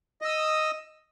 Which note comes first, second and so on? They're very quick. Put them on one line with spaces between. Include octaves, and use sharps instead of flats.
D#5 E6 D#6